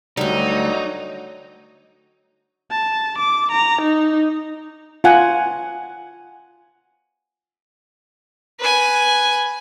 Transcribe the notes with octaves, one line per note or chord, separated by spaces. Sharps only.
D2 D3 F#3 G3 D#4
A5
D6
A#5
D#4
F4 F#5 G#5
B4 G#5